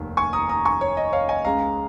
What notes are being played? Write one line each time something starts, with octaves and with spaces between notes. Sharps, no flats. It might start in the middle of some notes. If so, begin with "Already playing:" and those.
Already playing: F1 D#2
G#5 C#6
A#5 D#6
A#5 D#6
G#5 C#6
C#5
D#5
C#5 F5
D#5 G#5
C#2 C#3 G#3 F5 A#5